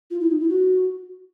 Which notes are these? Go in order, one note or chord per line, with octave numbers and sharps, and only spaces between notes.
F4
E4
D#4
E4
F#4